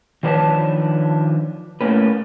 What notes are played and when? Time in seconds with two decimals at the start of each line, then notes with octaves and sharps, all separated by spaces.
0.23 D#3 F3 D4 B4 C#5 A5
1.81 A2 A#3 C#4 B4